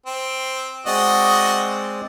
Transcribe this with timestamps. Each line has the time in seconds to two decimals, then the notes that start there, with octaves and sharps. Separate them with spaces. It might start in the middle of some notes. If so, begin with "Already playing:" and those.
0.06 C4
0.86 G#3 C4 F#4 D5 D#5